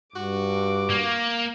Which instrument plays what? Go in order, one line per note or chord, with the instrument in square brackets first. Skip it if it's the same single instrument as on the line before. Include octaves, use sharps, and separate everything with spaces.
[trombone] G2 [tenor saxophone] F#4 [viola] D6
[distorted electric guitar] A#3